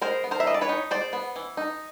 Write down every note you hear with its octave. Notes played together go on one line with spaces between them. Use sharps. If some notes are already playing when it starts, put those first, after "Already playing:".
G#3 A#4 C5
B3
A#4 C5
E5
E3 D#5
D5
B4 C#5
D#4
G#3 C5 D5
B3
E3
D#4